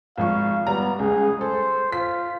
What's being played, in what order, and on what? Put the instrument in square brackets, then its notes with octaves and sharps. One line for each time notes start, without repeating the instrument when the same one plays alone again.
[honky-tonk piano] G#1 F3 C#6 [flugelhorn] F5
[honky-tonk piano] G3 A#5 [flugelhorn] B3
[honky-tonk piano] C#2 [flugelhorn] G#4
[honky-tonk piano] A4 [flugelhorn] C5
[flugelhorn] F4 [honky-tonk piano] B6